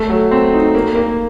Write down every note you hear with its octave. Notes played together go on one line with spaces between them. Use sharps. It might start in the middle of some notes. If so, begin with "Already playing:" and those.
Already playing: A3
F#3
C4
D#4
A#3
A#3